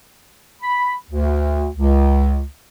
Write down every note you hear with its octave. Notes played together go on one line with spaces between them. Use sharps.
B5
D2
C#2